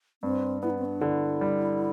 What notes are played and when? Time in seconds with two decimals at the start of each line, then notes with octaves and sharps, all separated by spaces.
0.23 G2 C4
0.63 B3 E4
0.70 D4
0.78 C4
0.85 D4
1.01 D3 E4
1.41 G3